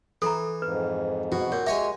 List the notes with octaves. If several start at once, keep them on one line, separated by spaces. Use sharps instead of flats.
E3 A4 A#5
F2 G#2 B4
B2 F#4
A#2 C#5
G#3 G4 C#5 E5 G#5